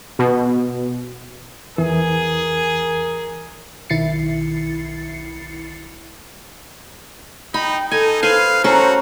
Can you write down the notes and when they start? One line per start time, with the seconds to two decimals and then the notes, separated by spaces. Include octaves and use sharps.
0.19 B2
1.78 E2 E3 G#4 A#4
3.90 B1 D#3 E4 A6 C7 C#7
7.54 D#4 G5 B5
7.91 D#4 A4 G#5
8.23 B4 C5 F5 G#5
8.64 C#4 F#4 A4 C5 A#5